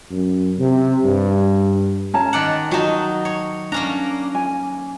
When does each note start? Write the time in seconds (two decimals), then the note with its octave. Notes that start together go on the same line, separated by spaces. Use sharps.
0.11 F#2
0.59 C3
1.04 G2
2.14 C#4 A5 A#5
2.33 D#3 D5 F#5
2.71 F#3 D#4 F#4 A5
3.25 C#5
3.72 A#3 C#4 D4 A#5
4.35 G#5